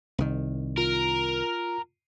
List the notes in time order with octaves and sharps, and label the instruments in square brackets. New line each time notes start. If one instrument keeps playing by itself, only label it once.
[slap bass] C2 D#3
[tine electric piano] F4 [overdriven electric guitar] A#4